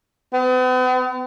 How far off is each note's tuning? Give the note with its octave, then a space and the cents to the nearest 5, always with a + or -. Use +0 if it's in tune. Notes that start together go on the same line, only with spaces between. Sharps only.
B3 +45